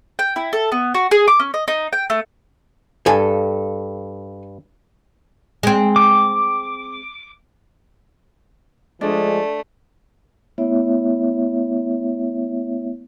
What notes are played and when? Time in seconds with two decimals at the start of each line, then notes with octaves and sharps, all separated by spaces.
0.19 G5
0.36 E4
0.53 A4
0.72 B3
0.94 F#4
1.11 G#4
1.28 D6
1.40 C#4
1.54 D#5
1.68 D#4
1.93 G5
2.10 A3
3.06 G2 A4 G#5
5.63 G#3 C4
5.96 D6
9.01 F3 G#3 A3 D4
10.58 A3 B3 E4 C#5 E5